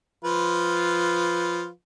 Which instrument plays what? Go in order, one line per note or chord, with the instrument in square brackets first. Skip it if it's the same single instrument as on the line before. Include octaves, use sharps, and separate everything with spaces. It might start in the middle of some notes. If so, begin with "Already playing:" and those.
[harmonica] F3 F4 B4